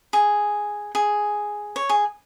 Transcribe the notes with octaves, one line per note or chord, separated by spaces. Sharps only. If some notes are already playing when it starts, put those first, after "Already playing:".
G#4
G#4
C#5
G#4